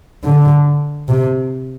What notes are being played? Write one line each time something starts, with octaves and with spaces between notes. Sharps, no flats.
D3
C3